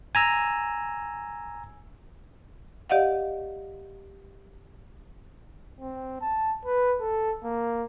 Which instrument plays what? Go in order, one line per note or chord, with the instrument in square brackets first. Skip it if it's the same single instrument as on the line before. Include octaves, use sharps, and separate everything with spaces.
[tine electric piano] G#5 A#5 E6
[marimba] G4 D5 D#5 F5 F#5
[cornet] C4
A5
B4
A4
A#3